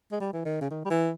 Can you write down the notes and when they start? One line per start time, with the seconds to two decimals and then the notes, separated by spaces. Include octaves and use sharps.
0.12 G#3
0.20 G3
0.33 E3
0.45 D#3
0.61 C#3
0.71 D#3
0.85 G3
0.90 E3